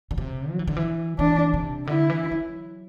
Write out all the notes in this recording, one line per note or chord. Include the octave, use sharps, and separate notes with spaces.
D3
C3
F#3
E3
D3
E3
E3 D4
C3
D3 E4
E3
F#3